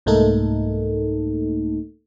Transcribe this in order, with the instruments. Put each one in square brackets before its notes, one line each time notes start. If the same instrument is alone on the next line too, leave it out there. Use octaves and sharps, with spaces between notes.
[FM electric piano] C2 G#2 A3 A#3 D#4 A4